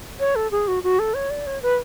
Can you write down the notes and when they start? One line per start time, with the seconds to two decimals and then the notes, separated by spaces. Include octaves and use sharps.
0.20 C#5
0.35 A4
0.51 G#4
0.68 F#4
0.83 F#4
0.99 A4
1.14 C#5
1.30 D5
1.46 C#5
1.62 B4